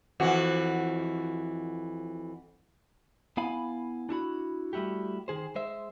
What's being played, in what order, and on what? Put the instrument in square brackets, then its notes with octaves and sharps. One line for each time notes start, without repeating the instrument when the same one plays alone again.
[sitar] F2 E3 F#4
[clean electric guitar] B3 E4 F5 G#5 B5
D4 E4 F#4 B5
G3 A3 E4 F#4 G4
D#3 G#4 C5
G#3 C5 E5